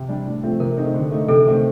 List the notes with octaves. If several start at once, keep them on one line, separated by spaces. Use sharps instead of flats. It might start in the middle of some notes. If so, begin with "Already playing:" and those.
Already playing: C3
G3 D4
A2
F3 A3 C4
C3 A#4
D#3 A3 C4 D#4
D3
A3 D#4
C3 A4
D#3 A3 C4